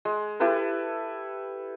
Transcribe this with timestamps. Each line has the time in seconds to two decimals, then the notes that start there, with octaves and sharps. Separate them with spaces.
0.05 G#3
0.40 E4 G4 A4 B4